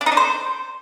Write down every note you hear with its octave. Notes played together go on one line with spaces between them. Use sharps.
D4
D#4
D4
C5